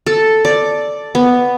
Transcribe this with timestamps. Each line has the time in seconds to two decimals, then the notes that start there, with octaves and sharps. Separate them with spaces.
0.06 A4
0.45 D5
1.15 B3